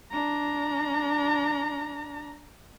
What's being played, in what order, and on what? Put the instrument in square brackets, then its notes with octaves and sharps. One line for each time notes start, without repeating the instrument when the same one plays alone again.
[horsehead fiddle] D4 A#5